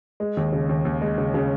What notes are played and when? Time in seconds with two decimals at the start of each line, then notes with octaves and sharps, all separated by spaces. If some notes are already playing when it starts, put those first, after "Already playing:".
0.20 G#3
0.37 D#2
0.52 C#3
0.69 D#2
0.85 D#2
1.01 G#3
1.18 C#3
1.34 C#3